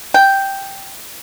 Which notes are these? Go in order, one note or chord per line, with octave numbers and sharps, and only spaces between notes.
G5